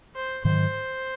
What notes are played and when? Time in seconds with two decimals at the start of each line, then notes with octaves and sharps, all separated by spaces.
0.15 C5
0.44 G#2 D#3 F#3 C5